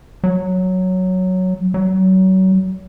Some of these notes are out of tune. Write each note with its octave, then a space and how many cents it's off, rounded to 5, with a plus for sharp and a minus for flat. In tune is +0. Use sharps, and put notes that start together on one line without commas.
F#3 +0
F#3 +30